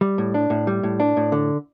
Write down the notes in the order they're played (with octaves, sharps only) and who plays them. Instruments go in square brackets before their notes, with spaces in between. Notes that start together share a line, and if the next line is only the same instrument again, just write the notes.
[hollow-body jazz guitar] G3
A2
D4
A2
G3
A2
D4
A2
D3